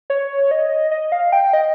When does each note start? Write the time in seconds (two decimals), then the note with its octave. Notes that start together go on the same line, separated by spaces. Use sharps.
0.10 C#5
0.51 D#5
0.91 D#5
1.12 F5
1.32 G5
1.53 D#5